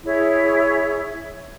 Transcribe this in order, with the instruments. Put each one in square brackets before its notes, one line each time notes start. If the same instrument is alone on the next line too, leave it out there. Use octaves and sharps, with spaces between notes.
[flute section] E4 G#4 C#5 E5